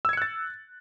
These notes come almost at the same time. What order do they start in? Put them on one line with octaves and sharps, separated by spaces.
E6 G#6 C#7 F#6 A6